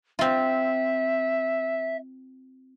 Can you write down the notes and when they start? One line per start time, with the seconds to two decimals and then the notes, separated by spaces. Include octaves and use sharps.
0.19 C4 F4 E5